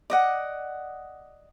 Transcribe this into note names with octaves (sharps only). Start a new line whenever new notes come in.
D5 D#5 F#5